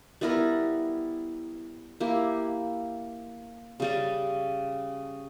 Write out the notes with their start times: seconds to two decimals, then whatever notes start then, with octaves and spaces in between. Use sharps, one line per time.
0.21 G3 B3 E4 A#4
2.00 A#3 E4 G4
3.80 C#3 G3 C#4